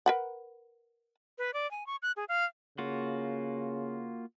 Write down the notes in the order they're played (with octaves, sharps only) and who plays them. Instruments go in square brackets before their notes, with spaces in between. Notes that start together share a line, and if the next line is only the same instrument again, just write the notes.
[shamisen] A#4 B4 F#5
[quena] B4
D5
G#5
C#6
F#6
G#4
F5
[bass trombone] C#3 [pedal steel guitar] A#3 F4 F#4